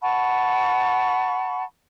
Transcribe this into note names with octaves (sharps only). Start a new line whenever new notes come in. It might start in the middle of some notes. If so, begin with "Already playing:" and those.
F#5 A5 B5 C#6